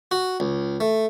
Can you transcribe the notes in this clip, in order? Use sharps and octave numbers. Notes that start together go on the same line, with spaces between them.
F#4
C#2
A3